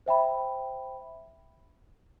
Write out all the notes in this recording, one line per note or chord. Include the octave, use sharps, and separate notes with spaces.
C5 E5 G5 B5